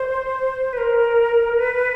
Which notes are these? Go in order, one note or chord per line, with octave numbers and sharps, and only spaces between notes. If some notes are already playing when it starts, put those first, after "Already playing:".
Already playing: C5
B4
A#4
B4